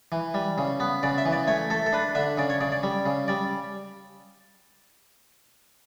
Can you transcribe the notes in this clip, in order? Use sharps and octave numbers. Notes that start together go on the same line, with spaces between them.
E3
G3
C#3
B3
C#3 D5
E5
E3
D5
A3 C#5
A3 A4
A4
D4 B4
D3 E5
C#3 D5
C#5
C#3 D5
D5
G3
C#3
G3 D5